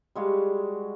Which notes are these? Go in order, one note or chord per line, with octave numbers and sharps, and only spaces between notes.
G3 G#3 F#4 F5